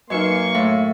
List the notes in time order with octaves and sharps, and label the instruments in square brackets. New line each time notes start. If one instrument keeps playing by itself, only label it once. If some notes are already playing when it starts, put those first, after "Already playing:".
[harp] F#2 [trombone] A#3 [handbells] D#4 B4 D#5 [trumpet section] C6 C#6
[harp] A2 [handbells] E5 F5